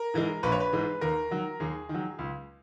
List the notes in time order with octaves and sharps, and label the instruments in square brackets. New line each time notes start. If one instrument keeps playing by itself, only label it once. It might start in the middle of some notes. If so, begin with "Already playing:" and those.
Already playing: [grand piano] A#4
G#2 E3 G#3
A#1 B4
C#5
B4
G#2 E3 G#3
D#2 A#4
D#3 F#3
D#2 G#4
D#3
F#3
C#2